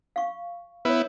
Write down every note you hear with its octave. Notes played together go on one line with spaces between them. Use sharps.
F5 C#6
B3 E4 B4 C#5